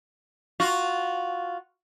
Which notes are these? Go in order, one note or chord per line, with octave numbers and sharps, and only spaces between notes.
F4 F#4